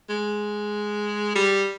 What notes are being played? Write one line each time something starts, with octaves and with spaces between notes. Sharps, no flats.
G#3
G3